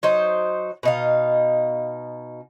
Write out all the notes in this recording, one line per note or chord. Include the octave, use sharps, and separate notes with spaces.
F#3 D#4 C5
B2 D#4 F5